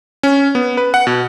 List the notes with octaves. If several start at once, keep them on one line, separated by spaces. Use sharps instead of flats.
C#4
B3
B4
F#5
B2